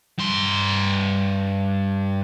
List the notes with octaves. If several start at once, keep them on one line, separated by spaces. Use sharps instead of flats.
G2 C6